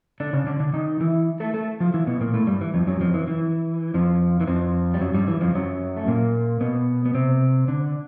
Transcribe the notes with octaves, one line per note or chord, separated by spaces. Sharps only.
D3 D4
C#3 C#4
D3 D4
D3 D4
D#3 D#4
E3 E4
A3 A4
A3 A4
F3 F4
E3 E4
B2 B3
A#2 A#3
A2 A3
G2 G3
E3
F2 F3
F#2 F#3
F2 F3
E3
E3
F2 F3
E3
F2 F3
G3
F#2 F#3
G2 G3
E3
F2 F3
F#2 F#3
A3
A#2 A#3
B2 B3
B3
C3 C4
D3 D4